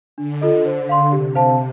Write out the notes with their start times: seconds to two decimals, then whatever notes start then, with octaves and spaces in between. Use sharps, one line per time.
0.17 D3 D4
0.41 F4 A4 D#5
0.65 C5
0.89 F5 C6
1.12 C3 G4
1.35 C5 F5 A5